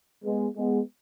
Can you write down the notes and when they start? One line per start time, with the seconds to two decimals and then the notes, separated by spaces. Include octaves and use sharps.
0.24 G#3 B3
0.57 G#3 B3